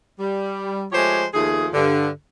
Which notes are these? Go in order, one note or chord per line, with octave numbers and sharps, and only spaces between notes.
G3
F3 G#3 A3 G4 C5 C#5
D#2 F3 A3 G#4
G2 D3